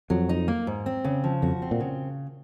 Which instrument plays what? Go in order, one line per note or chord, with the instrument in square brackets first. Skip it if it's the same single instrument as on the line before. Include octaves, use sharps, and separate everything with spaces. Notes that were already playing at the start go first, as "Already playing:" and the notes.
[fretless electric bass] F2 [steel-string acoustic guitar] F#3
[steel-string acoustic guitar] D#4
A#3
G#2
C4
C#3
F3
[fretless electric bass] F2 [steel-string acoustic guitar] F#4
[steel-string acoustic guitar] C4
[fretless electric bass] A#2
[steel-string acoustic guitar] C#3